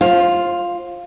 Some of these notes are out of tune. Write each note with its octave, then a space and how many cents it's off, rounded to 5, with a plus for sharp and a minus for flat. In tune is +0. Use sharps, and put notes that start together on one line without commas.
F4 +0 C5 +35